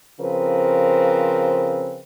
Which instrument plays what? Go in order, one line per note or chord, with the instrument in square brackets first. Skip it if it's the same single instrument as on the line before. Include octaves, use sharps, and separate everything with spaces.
[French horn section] C#3 F3 C4 A#4 B4